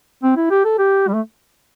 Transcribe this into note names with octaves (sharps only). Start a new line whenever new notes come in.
C4
E4
G4
A4
G4
G3
A3